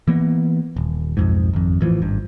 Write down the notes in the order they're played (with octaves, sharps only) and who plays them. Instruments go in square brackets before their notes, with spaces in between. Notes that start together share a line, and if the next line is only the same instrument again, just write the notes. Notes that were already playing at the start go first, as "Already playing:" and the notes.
[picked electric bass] E3 A#3 B3
D#1
B1 F2 G#2
G#1 F2
A1 E3 F3
G#1 G2